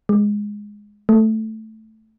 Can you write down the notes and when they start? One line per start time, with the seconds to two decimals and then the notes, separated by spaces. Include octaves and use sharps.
0.09 G#3
1.09 A3